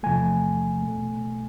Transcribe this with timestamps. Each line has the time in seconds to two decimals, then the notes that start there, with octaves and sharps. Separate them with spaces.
0.03 E2 C3 F3 A3 G#5
0.82 B2 A3